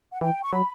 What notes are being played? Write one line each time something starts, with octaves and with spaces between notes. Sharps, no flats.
F#5
E3 G5
C#6
F#3 B5